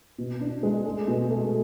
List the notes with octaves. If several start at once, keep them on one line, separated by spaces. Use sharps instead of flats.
B2
D4
G#3
A3
B2
A3